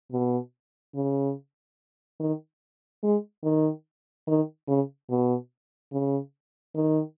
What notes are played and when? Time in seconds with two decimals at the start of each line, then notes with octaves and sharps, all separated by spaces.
0.12 B2
0.95 C#3
2.20 D#3
3.03 G#3
3.44 D#3
4.27 D#3
4.68 C#3
5.10 B2
5.92 C#3
6.75 D#3